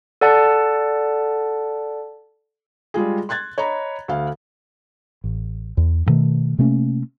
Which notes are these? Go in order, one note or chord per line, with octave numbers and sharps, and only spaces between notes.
A4 D5 F#5 A5
G3 G#3 F4 G#4
C6 F#6 G#6 A6
C#5 D#5 A#5 B5
D2 F5
A1
E2
G2 B2 D#3 A3
C3 A3 A#3 C#4